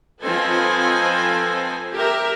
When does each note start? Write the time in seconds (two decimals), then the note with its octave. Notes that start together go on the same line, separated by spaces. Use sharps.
0.22 F3 C4 A4 B4 D#5 G#5
1.93 G4 A#4 E5